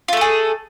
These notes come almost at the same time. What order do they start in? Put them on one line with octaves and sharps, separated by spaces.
F4 A3 A4 G#4